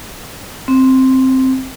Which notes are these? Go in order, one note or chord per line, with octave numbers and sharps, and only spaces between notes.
C4